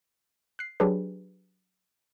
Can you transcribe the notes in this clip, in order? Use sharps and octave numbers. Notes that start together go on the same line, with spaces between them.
F#6 C7
F#3 D4 G4 G#4 B4